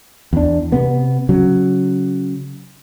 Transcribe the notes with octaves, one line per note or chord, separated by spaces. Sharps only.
E2 D4
C3 B3
C#3 F#3